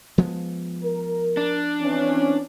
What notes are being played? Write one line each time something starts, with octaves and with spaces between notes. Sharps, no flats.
F3 G#3 B3
A#4
D4
E3 C4 C#4